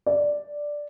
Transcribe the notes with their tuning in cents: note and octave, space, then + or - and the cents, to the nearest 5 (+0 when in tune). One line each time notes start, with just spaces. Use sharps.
D5 +0